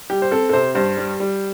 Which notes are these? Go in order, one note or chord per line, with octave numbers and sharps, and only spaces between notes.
G3 G4
C5
C4 A4
A4
C3 C5
G2 C5
G3
G3